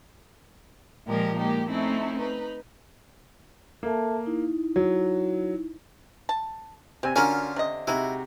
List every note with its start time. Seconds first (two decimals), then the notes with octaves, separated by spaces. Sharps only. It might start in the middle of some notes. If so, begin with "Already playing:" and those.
1.06 A#2 F3 G#3 A#3 G4 A#4
1.36 G#3 A#3 D#4 G4
1.69 A3 C4 C#4 D#4 E4
2.17 D#4 B4
3.83 A#3 A4 E5 A5
4.26 D#4 E4
4.76 F#3
6.29 A5
7.03 C3 C4 G#5
7.16 D3 C#4 F4 F#4 A#4 G#5
7.56 C3 D#5
7.87 C3 G#3 D#4 E4 F#4